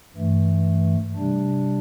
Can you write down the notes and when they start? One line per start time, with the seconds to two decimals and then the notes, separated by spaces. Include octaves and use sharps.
0.16 G2 E3 A3
1.16 C3 G3 D4